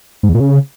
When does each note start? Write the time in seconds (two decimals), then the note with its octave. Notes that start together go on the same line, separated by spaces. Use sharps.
0.23 G#2
0.29 E2
0.35 A#2
0.40 C#3